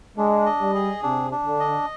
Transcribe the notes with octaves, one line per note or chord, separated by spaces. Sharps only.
G#3 D4
D#5
G3
G#4
C3 D4
D4
D3
D#5